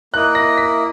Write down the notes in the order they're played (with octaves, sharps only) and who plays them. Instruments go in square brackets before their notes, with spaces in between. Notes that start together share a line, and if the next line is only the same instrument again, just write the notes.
[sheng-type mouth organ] A#3 E4 A#4 D#5 [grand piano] F#6
[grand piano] A#6
B6